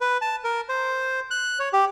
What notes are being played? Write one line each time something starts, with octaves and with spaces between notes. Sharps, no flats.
B4
A5
A#4
C5
F#6
C#5
G4